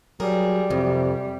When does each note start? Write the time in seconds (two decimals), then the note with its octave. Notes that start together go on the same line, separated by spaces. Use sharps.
0.20 F#3 G3 G#4 A#4
0.70 F2 C3